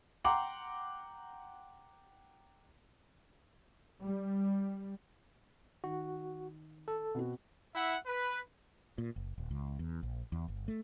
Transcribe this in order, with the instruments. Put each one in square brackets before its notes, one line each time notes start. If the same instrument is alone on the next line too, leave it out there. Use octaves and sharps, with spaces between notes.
[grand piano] F#5 G5 A#5 C6 D6
[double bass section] G3
[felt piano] D#3 [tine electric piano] F#4
[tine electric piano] A4
[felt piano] B2 C4 F#4
[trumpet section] E4 E5 F#5
B4
[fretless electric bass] A#2
F#1
D#1
C#2
E2
A#1
E2
G1
A3